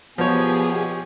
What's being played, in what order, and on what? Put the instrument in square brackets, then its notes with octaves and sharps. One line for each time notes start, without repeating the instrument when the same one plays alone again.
[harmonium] B2 B3 [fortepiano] F3 C#5 [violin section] G4 G#4